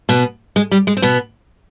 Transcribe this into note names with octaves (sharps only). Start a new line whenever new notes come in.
B2 B3
G#3
G3
G#3
C4
B2 B3